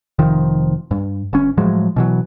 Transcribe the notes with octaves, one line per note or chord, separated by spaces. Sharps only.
F1 D#3 F3
G2
G1 C#4
A2 F3 F#3 G#3
B2 E3 F#3